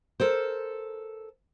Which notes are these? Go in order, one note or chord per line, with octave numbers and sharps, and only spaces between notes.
A4 A#4 C5